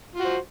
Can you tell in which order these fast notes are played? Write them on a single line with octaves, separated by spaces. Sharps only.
F4 F#4 C5